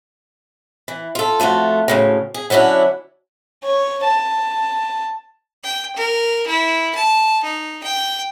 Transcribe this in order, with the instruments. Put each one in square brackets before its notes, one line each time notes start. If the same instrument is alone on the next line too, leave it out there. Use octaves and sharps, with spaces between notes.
[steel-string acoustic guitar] E3
F4 A4
F2 A3 F4 F#4
D2 A2 C#3
G#4
D3 F#3 C#4 D4 E4
[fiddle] C#5
A5
[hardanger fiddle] G5
A#4
E4
A5
D#4
G5